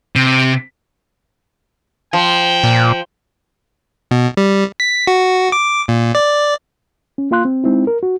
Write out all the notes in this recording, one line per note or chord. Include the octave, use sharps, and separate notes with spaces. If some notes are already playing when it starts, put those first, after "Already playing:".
C3
F3 G5
A#2
B2
G3
B6
F#4
D6
A#2
D5
C#4
A#3 F4 F5 C6 F#6
C4
G#3 C4 D#4 E4
A#4
F#4